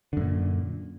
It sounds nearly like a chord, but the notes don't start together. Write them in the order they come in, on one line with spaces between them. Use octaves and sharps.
D3 F#2 A#2